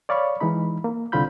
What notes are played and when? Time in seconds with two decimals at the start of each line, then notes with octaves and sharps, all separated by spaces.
0.09 C#5 D5 F5 B5 C#6
0.40 E3 G#3 D#4 B5
0.84 A#3
1.12 C2 D3 C4 F4 B5 G6